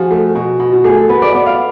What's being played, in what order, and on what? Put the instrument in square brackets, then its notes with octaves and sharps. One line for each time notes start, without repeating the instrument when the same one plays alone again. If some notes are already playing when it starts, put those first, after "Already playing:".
Already playing: [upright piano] F3 [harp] F#4 G#4
[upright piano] A3
B2
B2
[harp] F#4
[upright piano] A3 [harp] G#4
[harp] A4
[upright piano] B3 [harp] B4
[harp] D5
[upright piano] B3 [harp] D5
[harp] F5